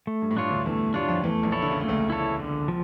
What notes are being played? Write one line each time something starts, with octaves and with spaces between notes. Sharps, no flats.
A3
G2
A2
G2 D4 F4 C#5
D2 D3
E2 E3 A3
G2 G3 D4 F4 C#5
F2 F3
E2 E3 A3
A#1 A#2
E4 A4 C#5
D3
C#3
A#2 A3
C#2 C#3
E4 A4 C#5
D3
F3